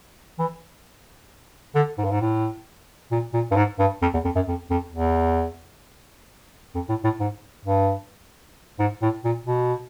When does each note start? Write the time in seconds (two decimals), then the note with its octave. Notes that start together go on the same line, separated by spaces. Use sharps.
0.39 E3
1.75 D3
1.98 G#2
2.04 G2
2.11 G#2
2.21 A2
3.11 A#2
3.33 A#2
3.51 G2
3.56 G#2
3.79 G2
4.02 F2
4.14 E2
4.24 F2
4.35 F#2
4.48 F2
4.70 F2
4.92 E2
6.75 F2
6.89 A2
7.04 A2
7.20 G#2
7.65 G2
8.79 G#2
9.02 A2
9.24 A#2
9.46 B2